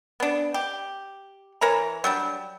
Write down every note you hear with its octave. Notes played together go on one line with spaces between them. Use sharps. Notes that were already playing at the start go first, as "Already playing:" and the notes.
B3 D4
G4
E3 A#4 C#5 A#5
F#3 G3 D4